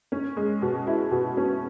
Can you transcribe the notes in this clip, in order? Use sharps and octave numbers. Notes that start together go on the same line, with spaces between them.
C#4
G#3
B2
E4
B2
C#4